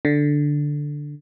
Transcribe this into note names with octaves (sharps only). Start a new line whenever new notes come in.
D3